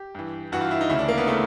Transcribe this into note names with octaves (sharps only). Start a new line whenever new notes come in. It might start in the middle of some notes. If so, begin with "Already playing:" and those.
Already playing: G4
G2 E3
G2 E3 F#4
F4
E4
D#4
D2 C#3 E3 E4
D4
A#3
B3
C#3 E3 A3